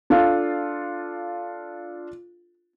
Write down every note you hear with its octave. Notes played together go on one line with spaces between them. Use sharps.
D4 F4 A4 F5